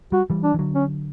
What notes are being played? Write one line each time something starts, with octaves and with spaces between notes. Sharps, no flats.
G3 F#4
E3 G3
D4
E3
D3 F#3
C#4